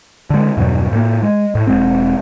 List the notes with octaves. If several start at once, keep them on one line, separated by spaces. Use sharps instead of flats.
D3 G#3
E2 G2 B2 F#3
A2 A#3
G#3
A2
E1 G#3 C4